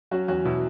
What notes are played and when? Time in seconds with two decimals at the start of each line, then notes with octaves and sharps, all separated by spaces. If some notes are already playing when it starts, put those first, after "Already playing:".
0.11 F#3 C#4 F#4
0.28 E2 C#4 F#4
0.45 B2 E4